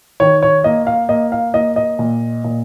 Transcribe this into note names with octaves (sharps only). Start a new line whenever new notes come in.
D#3 C#5
C#5
A#3 D#5
F5
A#3 D#5
F5
A#3 D#5
D#5
A#2
A#2